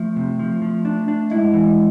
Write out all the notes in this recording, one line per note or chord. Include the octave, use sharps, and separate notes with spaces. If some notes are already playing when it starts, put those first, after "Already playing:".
Already playing: F3 A3
C3
F3
F3
D4
D4
G#3 E4
E3